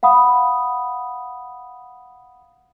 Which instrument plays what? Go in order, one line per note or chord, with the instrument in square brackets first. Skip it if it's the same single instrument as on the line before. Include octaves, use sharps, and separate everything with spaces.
[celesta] F5 F#5 B5 D#6